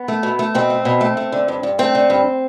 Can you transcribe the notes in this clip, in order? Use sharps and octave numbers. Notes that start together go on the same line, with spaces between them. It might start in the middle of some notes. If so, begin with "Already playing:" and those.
Already playing: B3
A3
B2
A3
B2 C4
A3
B2
A3
A3
D3
G2
G2
A3 C4
D3
G2